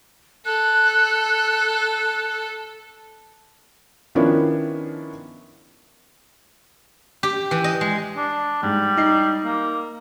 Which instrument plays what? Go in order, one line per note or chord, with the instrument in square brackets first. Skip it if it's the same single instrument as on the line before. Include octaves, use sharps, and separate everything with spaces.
[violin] A4 [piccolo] F#6
[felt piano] D#3 F3 B3 C#4 D4 E4
[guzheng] G4
E3
D#5
G#3
[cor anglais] D4
[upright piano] G#2 [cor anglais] G3
[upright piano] D#4 C7
[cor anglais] A#3